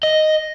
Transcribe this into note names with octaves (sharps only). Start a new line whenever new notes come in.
D#5